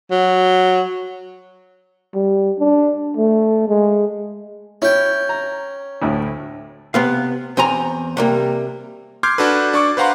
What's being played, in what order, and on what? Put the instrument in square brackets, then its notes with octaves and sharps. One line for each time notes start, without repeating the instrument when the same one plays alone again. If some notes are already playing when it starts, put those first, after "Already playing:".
[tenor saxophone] F#3
[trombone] G3
D4
A3
G#3
[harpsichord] C#4 G5 [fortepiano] E4
[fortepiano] A#5
D2 A2 E4
[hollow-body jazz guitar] C3 B3 F5
E2 C4 G#5 A#5
C3 G3 A#3
[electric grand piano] C6 D6 F6 G6 G#6 C7
D4 F#4 A4 B4
D4 C#6 D6
B4 C5 F5 F#5 A#5 C6